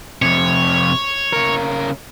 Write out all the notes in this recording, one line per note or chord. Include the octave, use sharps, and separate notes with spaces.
F2 C3 C#5
C#3 A#4